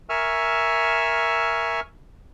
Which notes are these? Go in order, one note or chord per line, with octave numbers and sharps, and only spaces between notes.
A#4 E5 G#5 C#6 E6 F6